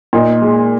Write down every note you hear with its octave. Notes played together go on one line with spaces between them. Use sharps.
A#2 D#4
G#3